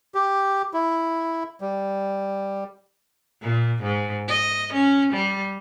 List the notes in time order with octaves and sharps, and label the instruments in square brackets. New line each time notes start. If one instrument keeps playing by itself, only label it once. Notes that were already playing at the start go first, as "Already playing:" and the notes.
[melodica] G4
E4
G3
[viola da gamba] A#2
G#2
D#5
C#4
G3